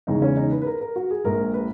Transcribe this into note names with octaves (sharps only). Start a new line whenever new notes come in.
E2 C#3 E3 G#3 D#4
C#4
D#4
B4
B4
A#4
A#4
F#4
G#4
A#1 A#2 G#3 A#4
B4